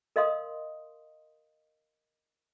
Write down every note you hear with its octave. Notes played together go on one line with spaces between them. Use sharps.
A#4 D#5 F5 C6 D#6